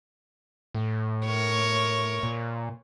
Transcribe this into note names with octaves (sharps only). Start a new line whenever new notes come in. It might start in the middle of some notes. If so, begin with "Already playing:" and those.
A2
A#4 C#5
A#2